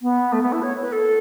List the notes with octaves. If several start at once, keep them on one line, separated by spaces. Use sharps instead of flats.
B3
A3
B3
E4
C#5
B4
A4